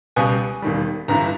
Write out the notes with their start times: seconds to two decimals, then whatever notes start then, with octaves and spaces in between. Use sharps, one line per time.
0.16 C#2 B2 G3 G#5
0.62 E1 D#2 D#3 G3
1.08 G1 G2 E3 A#5